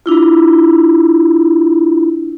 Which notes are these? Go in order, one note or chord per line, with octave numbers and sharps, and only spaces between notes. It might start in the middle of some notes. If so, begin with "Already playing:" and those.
D4 E4 F4